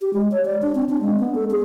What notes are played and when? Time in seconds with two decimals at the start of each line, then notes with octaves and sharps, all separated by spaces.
0.01 G4
0.14 G#3
0.32 C#5
0.45 D5
0.62 D4
0.75 C4
0.89 D4
1.01 G#3
1.20 B3
1.35 A4
1.51 G#4